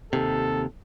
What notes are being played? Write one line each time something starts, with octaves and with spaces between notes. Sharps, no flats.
D#2 C3 A4